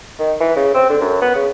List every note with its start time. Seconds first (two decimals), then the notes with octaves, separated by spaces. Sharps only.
0.19 D#3
0.40 E3
0.56 C#3
0.74 C4
0.89 D3
1.01 F#2
1.21 B3
1.35 C#3